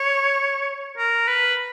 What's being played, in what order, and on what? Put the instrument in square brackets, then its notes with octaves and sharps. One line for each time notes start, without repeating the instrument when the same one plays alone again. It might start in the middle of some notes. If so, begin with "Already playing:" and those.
Already playing: [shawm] C#5
A#4
B4